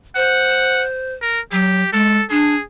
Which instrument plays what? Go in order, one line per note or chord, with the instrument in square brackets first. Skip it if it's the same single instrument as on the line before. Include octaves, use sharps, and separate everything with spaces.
[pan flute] C5 [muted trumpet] F#5
[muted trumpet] A#4
[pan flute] F#3 [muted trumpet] G4
[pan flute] G#3 [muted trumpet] A4
[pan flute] D4 [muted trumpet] G#4